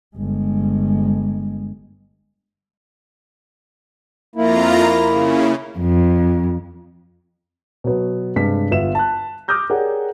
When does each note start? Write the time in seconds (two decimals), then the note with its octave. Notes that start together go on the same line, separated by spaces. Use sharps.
0.16 G1 G#3
4.36 F2 A#3 E4 F4 A#5
5.07 C#3
5.78 F2
7.84 B2 F#3 B3
8.36 G2 C3 G#3 B6
8.71 G1 B3 F4 E5 E7
8.95 A5 F#6
9.48 D6 D#6 F6 G6 A#6
9.70 G4 G#4 A#4 C#5 D5 F#5